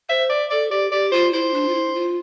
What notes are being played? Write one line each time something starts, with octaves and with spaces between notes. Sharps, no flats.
C5 E5
D5
A4 D5
G4 D5
G4 D5
F4 C5
E4 C5
D4
F4
E4
F4